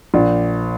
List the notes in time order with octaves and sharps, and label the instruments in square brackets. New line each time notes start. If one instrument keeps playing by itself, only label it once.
[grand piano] A#1